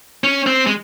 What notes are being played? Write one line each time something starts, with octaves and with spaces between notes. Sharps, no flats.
C#4
C4
G#3